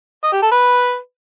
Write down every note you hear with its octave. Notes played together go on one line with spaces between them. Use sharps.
D#5
G4
A4
B4